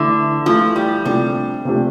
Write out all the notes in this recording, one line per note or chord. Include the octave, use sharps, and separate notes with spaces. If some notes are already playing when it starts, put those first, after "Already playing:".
Already playing: D3 E3 A3 E4
E3 F3 A3 E4
G3
C3 F3 G3 A3 D4 G4
C3 F3 A3 D4 G4